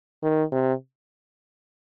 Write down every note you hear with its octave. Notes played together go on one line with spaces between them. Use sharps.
D#3
C3